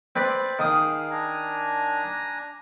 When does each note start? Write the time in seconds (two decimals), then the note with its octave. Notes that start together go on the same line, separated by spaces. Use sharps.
0.16 C4 B4 D5
0.59 D#3 G#4 F5 D#6
1.11 D4 G#5 A#5